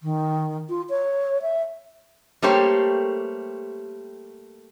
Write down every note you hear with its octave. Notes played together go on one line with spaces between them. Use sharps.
D#3
F4
C#5
E5
G3 A3 A#3 G4 C5 C#5